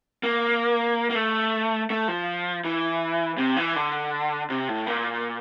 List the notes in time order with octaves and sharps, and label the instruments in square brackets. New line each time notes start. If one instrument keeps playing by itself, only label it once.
[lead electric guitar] A#3
A#3
A3
A3
F3
E3
C3
E3
D3
C3
A2
A#2